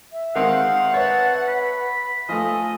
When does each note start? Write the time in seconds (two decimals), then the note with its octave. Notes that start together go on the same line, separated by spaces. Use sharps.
0.12 E5
0.36 D#3 G#3 C4 F5 F#5
0.94 B4 C#5 E5 A5
1.48 B5
2.29 F3 A3 D#5 G#5